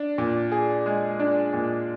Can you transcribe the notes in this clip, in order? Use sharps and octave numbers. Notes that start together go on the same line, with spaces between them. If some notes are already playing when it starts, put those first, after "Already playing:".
Already playing: D4
A#2
G#4
G#3
D4
A#2